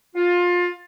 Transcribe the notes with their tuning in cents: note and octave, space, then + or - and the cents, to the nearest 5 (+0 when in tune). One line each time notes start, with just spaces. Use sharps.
F4 +20